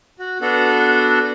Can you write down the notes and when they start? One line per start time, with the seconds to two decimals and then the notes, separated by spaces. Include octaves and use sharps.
0.19 F#4
0.41 B3 D4 F#4 A4